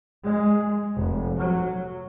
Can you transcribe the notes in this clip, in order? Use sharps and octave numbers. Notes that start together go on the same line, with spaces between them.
G#3
F1
F#3